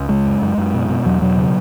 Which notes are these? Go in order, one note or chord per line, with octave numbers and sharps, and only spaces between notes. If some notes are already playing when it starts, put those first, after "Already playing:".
Already playing: C#2
C#3 G#3
F#2
F#2
F#2
B2
B2
E2 F#3
B2 F#3
C#3